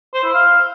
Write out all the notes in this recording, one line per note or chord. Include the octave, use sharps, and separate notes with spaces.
C5
E4
F5